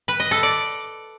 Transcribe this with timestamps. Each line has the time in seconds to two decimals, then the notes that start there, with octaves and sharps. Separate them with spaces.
0.08 B4
0.20 D#5
0.31 A4
0.43 D5